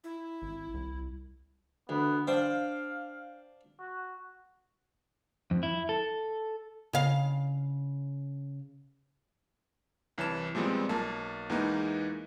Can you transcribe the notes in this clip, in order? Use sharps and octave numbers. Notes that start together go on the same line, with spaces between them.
E4
G#1
C2
D2 B3
D4 C5 F5 G5
F#4
F2
E4
A4
C#3 F5
C2 E3 C#5 A5 E7
A#2 F3 G3 G#3 B3 C4
B1 A#3 A5
E2 E3 G#3 A#3 D#4